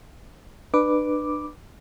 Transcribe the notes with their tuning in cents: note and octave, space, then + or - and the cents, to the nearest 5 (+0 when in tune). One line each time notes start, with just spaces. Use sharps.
D4 +35 B4 +0 D6 +0